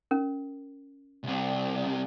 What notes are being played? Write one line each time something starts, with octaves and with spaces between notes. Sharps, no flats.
C#4 A#4
C2 C3